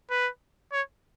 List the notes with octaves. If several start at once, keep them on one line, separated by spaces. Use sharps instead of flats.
B4
C#5